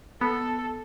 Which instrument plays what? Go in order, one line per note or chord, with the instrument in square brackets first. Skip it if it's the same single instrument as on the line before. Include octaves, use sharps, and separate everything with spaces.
[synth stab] B3 [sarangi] A4